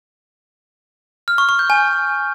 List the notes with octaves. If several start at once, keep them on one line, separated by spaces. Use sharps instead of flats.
F6
C#6
C#6
G6
G#5